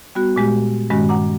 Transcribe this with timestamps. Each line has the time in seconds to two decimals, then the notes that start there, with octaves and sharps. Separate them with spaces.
0.15 G3 B3 F#4
0.36 A#2 G#3 G4
0.90 G2 D#3 G#3 C#4 F#4
1.09 F#5 A#5 D6